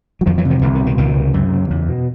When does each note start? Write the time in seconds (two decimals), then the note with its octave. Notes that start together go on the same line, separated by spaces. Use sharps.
0.21 F#3
0.26 F2 D#3 F3
0.38 E3 F#3
0.45 C3
0.50 D#3 F3
0.62 C2 D3 E3
0.75 D#3
0.80 B2
0.86 D#3
0.98 C#2 D#3
1.16 C3
1.34 F#2
1.52 C#3
1.70 E2
1.89 B2